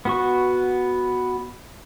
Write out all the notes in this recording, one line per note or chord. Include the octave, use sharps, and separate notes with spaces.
B3 F#4 C#6